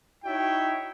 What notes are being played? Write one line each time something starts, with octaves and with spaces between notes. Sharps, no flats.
D#4 E4 F#4 C#5 E5 G5